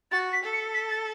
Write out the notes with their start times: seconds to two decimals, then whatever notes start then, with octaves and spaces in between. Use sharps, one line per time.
0.11 F#4 A6
0.33 B6
0.43 A4
0.53 C#7
0.74 B6
0.90 A6